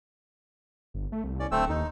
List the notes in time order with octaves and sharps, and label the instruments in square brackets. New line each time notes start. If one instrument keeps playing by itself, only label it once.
[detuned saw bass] G1
A3
C2
[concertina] C#4 D5
[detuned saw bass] D1 [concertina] A3 C4 E6
[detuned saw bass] D#2 [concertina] D#4